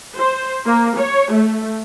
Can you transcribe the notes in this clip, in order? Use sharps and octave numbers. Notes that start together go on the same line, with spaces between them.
C5
A#3
C#5
A3